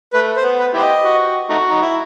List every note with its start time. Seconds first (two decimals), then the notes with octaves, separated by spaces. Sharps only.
0.13 A3 B4
0.37 C5
0.44 B3
0.59 B4
0.74 B3 E4 G4 C5
0.82 D#5
1.05 F#4
1.50 A3 D#4 F#4
1.69 D#4
1.82 E4